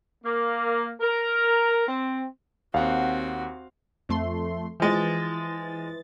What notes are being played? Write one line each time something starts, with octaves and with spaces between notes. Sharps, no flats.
A#3
A#4
C4
D#2 C4 F#4 F5 F#5
F2 A3 C6
E3 F3 G#3 A6